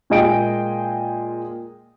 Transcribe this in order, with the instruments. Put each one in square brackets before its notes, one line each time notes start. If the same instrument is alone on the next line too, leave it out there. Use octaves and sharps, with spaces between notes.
[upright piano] A#2 G#3 G#4 D#5 G5 D7